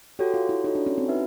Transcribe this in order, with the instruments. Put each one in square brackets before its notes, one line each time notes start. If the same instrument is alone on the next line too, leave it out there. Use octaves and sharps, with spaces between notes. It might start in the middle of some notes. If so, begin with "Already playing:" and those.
[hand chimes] F#4 A4 C#5 [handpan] G4
[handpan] F4
E4
[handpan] D#4 [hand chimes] F#4 A4 C#5
[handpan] D4
C#4
C4
[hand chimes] D#4 F#4 B4 E5